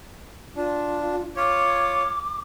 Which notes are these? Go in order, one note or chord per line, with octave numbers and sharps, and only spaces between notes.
D4 F4
F4 C#5 D6